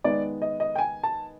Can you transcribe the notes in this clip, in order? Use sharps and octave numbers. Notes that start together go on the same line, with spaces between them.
D#3 G#3 B3 D#4 D5
D#5
D#5
G5
G#5
A5